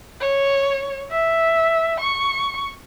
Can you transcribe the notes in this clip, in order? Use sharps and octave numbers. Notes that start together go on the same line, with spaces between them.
C#5
E5
C#6